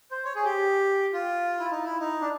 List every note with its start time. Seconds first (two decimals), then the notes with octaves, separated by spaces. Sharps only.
0.11 C5
0.25 C#5
0.35 G#4
0.44 G4
1.13 F4
1.59 E4
1.71 D#4
1.84 E4
2.00 D#4
2.21 D4